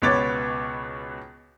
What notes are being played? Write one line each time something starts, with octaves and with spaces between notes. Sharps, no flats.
C#2 B2 B3 C#5 D6 A6